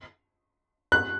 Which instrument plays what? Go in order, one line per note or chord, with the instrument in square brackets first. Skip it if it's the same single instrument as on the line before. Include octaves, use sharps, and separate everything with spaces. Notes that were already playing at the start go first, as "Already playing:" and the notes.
[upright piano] F#6